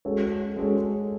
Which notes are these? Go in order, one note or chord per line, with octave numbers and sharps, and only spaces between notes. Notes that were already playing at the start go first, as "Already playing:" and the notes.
G#3 C#4 F#4 A4 C#5
G#3 C#4 F#4 A4 C#5